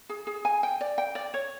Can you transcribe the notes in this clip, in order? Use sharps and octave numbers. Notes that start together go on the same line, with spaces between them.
G#4
G#4
G#5
G5
D5
G5
D5
C#5